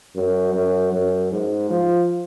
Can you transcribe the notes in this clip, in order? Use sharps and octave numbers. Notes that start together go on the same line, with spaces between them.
F#2
F#2
F#2
G#2
F3